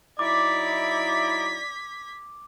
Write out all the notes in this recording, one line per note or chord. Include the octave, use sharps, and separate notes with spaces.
F#3 D#4 E4 D5 D6 G#6 B6